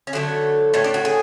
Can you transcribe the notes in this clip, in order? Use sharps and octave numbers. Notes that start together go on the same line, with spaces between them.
C#4
D3 F#3 A3 B3
A2 F#3 A3 C#4
D4
F#4
G#4